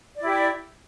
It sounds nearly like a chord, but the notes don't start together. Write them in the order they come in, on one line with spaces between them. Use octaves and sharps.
D5 E4 G4